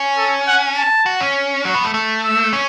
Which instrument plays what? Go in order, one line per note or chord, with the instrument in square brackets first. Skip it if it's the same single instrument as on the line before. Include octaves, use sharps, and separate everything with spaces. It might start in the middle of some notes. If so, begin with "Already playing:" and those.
Already playing: [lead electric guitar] C#4
[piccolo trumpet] A4
F#5
A5
[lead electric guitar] F#4
C#4
[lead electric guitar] F#3 [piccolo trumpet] C#6
[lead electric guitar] B3
A3
A3
[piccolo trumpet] E6
[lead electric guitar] C#4